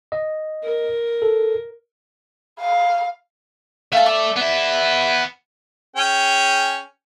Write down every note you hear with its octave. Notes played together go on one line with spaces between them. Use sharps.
D#5
A#4
A4
F5
A3 F5 A5
D5
B3 E5
C#4 G#4 G5